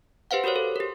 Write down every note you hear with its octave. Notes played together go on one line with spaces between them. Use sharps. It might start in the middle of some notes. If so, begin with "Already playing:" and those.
G4 B4 C5 F5 F#5
F#4 G4 A#4 C5 C#5
A4
G4 A#4